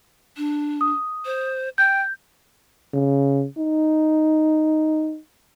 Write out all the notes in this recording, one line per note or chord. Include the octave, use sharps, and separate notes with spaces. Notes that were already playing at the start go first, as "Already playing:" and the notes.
D4
D#6
C5
G5 G6
C#3
D#4